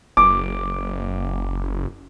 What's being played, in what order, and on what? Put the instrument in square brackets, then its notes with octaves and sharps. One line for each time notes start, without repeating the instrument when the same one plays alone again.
[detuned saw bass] F#1 [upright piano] D6